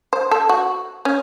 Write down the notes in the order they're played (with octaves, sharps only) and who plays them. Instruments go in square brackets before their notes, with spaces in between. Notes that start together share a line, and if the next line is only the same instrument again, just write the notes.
[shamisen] C5
A4
F#4
C#4